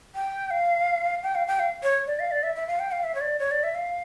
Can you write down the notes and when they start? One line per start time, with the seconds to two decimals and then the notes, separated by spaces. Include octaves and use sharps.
0.15 G5
0.51 F5
1.23 G5
1.35 F5
1.47 G5
1.59 F5
1.83 C#5
2.07 D5
2.20 F5
2.31 D5
2.43 E5
2.56 E5
2.67 F5
2.79 G5
2.92 F5
3.04 E5
3.15 C#5
3.21 D5
3.39 C#5
3.51 D5
3.64 E5
3.75 F5